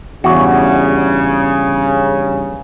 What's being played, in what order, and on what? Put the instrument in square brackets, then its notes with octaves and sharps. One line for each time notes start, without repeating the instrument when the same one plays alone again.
[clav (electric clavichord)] E2 F#4 [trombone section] G2 C#3